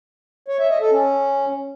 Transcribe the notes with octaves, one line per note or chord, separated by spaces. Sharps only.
C#5
E5
D#5
A4
C#4